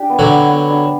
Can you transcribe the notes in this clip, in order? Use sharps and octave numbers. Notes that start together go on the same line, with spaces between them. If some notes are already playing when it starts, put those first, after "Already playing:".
Already playing: D4 G4 D5
B3
D3 F#3
D4
B3
D4